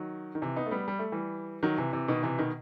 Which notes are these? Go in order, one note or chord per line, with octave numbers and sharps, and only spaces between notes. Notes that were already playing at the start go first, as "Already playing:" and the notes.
Already playing: D#3 F#3
D#3
C3 E3
B3 D#4
A3
G3 B3
G3
A3
E3 G3
D#3 F#3
C3 E3
C3 E3
B2 D#3
C3 E3
B2 D#3